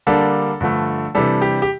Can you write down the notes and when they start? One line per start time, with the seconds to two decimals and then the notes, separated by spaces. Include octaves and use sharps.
0.07 D3 G3 A#3 D4 A4
0.61 G2 D3 F3 A3
1.15 C3 E3 G3 D4 A4
1.42 G4
1.62 G4